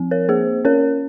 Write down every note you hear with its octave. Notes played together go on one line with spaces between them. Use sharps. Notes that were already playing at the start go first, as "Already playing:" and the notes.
Already playing: F3 C4
A#4 C#5
A#3 G#4 C5
C#4 A#4 C#5